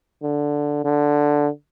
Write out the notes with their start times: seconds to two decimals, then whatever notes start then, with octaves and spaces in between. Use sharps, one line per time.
0.23 D3
0.84 D3